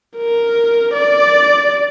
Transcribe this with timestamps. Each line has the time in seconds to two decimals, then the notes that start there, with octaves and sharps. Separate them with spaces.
0.17 A#4
0.93 D5